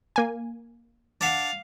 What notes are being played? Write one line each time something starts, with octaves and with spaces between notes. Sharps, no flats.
A#3 G#5
D4 F5 F#5